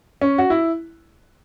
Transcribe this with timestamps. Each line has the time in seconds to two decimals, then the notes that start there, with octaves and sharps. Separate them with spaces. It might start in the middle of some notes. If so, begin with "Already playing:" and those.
0.21 C#4
0.38 F#4
0.50 E4